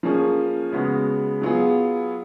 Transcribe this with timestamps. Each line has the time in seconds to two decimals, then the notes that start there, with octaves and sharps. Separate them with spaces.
0.03 F3 A#3 C#4 G#4
0.72 C#3 G#3 B3 F#4
1.42 F#3 B3 F4 G#4